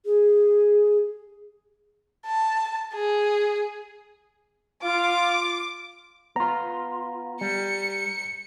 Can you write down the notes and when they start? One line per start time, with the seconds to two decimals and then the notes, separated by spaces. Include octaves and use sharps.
0.05 G#4
2.26 A5
2.94 G#4
4.83 F4 D6
6.36 B3 F4 A#5
7.41 G3 C#7